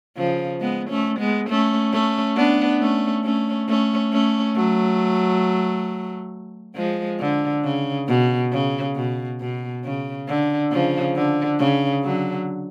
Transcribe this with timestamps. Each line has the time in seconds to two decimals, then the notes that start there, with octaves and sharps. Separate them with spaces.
0.17 C#3 F3
0.61 G#3 B3
0.90 A3 C#4
1.19 G#3 B3
1.50 A3 C#4
1.93 A3 C#4
2.36 B3 D4
2.81 A3 C#4
3.24 A3 C#4
3.69 A3 C#4
4.13 A3 C#4
4.56 F#3 A3
6.76 F3 G#3
7.20 D3
7.64 C#3
8.08 B2
8.52 C#3
8.96 B2
9.40 B2
9.85 C#3
10.27 D3
10.72 C#3 F3
11.15 D3
11.59 C#3
12.04 D3 F#3